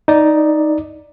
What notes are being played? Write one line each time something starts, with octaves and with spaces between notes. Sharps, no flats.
D#4 D5